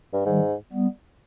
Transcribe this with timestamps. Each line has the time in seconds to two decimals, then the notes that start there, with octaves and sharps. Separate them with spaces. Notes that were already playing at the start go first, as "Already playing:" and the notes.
0.13 G2
0.26 G#2 D#3 G3
0.73 G3 B3